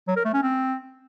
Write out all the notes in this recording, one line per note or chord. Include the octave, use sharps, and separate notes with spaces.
F#3
A#4
A3
C#4
C4